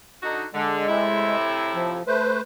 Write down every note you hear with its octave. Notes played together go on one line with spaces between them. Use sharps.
D3 D#4 F#4
D3 G#3
A2 C3 E4
F3
A3 B4 C5